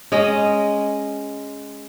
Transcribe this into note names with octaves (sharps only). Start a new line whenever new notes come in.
G#3 C#4 D#5